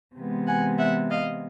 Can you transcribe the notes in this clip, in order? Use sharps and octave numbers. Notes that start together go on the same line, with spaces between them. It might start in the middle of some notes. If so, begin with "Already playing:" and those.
C3 E3 G#3 B3
F#5 G#5
E5 F#5
D#5 F5